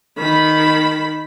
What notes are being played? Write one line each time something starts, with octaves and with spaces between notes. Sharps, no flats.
D#3 B5